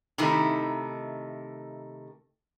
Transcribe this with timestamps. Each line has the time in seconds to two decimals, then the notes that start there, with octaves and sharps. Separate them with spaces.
0.18 C3 D#3 A3 D#4 E4